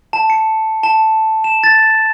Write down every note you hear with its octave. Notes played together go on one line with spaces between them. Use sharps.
A5
C#7
A5
E7
A6